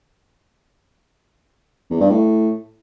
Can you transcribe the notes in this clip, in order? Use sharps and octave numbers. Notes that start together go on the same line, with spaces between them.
E2
G2
A2